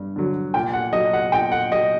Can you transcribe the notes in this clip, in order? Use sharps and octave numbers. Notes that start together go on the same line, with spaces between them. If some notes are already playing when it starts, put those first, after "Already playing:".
Already playing: G2
D3 F#3
A#2 G5
F#5
F#3 D#5
F#5
A#2 G5
F#5
F#3 D#5